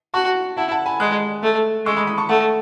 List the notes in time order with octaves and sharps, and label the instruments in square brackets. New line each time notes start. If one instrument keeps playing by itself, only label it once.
[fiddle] F#4 [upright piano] A5 C#6
[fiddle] E4 [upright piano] F#5 A5
[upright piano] F#5 A5
G#5 B5
[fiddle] G#3 [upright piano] D#6 F#6
[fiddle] A3
[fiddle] G#3 [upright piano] C#6 E6
[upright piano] B5 D#6
B5 D#6
A5 C#6
[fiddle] A3 [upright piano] F#5 A5